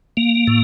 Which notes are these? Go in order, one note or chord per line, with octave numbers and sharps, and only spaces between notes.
A#3
A2